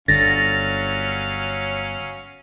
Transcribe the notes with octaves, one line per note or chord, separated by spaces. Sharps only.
G1 D3 F#3 C#4 F5 A6 A#6